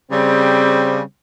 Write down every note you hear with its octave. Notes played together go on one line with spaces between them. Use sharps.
C#3 G3 C4